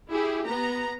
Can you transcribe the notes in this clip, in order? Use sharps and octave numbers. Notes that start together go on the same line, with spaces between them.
E4 G4 G#4
B3 A#5